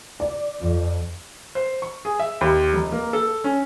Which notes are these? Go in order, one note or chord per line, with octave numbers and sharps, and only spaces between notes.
D5
F2
C5
C#6
G#4
E5
D#2
F1
A#3
A4
C#4